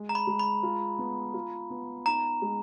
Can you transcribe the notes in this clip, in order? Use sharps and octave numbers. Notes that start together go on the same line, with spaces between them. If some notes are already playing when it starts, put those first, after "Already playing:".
Already playing: G#3
A#5
B5
G#3
B5
F4
B3
F4
B3
D#4 A#5
G#3